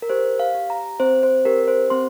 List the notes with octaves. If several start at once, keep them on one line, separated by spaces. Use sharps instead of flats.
A#4
G4 C5
F5
G4
A#5
C4 C5
C5
G4 A#4
C5
C4 C6